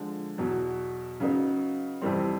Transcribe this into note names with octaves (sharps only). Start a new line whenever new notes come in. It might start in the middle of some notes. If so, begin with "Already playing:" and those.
Already playing: D3 F3 G#3
E2 B2 F#3
C#3 F#3 B3 D#4
F2 C3 E3 G3 C4